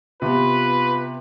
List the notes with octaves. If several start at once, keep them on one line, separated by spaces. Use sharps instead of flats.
C3 B3 F4 B4